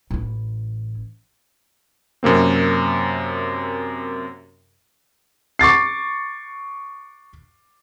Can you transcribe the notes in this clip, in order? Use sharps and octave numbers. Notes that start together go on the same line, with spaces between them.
A1 E4
F#2 C3 A#3 C4
C#6 D6 A6 C7